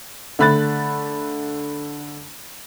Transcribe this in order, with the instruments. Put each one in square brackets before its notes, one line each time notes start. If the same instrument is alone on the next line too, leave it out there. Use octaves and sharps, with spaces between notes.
[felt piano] D3 A3 B5 F#6 A6